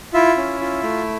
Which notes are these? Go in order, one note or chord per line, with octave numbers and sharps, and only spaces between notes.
E4 F4 E5
C#4
F4
A3